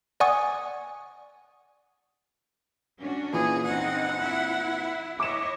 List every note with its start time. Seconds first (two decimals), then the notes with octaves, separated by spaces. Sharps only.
0.20 D5 F#5 G#5 C#6 D#6
2.99 C#4 D4 F#4
3.33 A#2 E3 G#4
3.65 C4 D#4 F#5
4.19 E4
5.20 E4 C#5 D#5 D6 E7